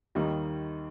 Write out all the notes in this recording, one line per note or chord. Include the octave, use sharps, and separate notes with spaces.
D#2 D#3 G3 D#4